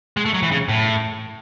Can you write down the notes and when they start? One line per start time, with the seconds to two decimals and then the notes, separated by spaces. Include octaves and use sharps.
0.17 G#3
0.25 A3
0.34 F#3
0.43 E3
0.51 C#3
0.69 A2